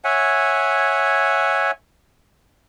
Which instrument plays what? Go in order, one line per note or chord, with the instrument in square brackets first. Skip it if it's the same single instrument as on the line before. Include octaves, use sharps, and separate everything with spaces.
[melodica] C#5 E5 F#5 G#5